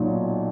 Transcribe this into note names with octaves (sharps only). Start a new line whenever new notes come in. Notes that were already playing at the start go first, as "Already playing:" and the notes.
Already playing: B1 A#2 F#3